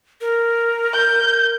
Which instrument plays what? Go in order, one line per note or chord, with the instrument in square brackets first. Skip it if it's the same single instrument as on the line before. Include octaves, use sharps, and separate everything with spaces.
[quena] A#4
[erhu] G6